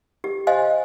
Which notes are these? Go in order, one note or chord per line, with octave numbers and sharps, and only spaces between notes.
G4
C5 D#5 F5 G#5 C6